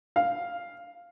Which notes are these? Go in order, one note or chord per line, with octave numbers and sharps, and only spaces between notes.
F5